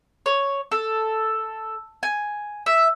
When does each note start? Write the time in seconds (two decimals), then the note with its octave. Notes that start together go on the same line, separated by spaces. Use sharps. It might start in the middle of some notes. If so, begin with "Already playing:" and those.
0.26 C#5
0.72 A4
2.03 G#5
2.66 E5